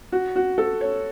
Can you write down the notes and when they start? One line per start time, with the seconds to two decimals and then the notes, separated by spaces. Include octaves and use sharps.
0.12 F#4
0.36 F#4
0.58 A4
0.81 C#5